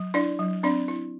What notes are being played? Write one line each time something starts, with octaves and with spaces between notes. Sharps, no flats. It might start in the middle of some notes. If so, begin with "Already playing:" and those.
Already playing: F#3
D4 E4 D5
F#3
C4 D4 D5
E4